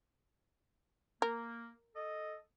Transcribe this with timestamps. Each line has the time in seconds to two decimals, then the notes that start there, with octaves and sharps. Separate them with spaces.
1.22 A#3 A#4
1.95 A4 D#5